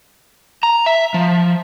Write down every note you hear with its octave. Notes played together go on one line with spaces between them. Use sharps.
A#5
E5
F3